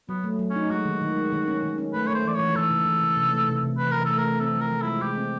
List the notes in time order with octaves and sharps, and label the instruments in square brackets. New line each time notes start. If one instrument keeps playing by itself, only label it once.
[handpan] F#3 [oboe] B3
[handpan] A3
F#3
[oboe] C#4
[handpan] D#4
[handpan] G#3 [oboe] F#4
[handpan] D#3
D#3
G#3
D#3
C#4
D#3
C#4
[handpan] A3 [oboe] B4
[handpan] A3 [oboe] C#5
[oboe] C5
[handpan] E3 [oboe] D5
[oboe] C#5
[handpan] E3
[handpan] E3 [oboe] A4
[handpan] C#3
E3
C#3
C3
A3
C3
C3
[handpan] E3 [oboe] B4
[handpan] E3 [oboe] A#4
[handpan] A3 [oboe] A4
[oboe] A#4
[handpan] A3
[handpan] C4 [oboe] A4
[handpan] F3
[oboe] A#4
[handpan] F3
[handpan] G#3 [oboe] E4
[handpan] G#3 [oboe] G4
[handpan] C4